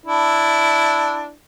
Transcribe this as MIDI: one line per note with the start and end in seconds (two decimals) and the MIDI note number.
0.06 1.32 62
0.06 1.32 64